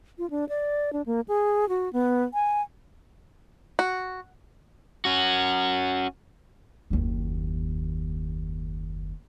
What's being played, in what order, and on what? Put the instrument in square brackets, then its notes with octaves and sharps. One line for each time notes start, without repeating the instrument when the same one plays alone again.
[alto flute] F4
D4
D5
D4
A#3
G#4
F#4
B3
G#5
[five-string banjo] F#4
[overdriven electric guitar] C#4 F#4
[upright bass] F#1 D#2